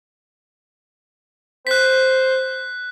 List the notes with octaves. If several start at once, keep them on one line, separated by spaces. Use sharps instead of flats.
C5 F#6 B6